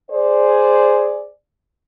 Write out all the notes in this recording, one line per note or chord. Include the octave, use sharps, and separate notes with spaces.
G#4 C5 D5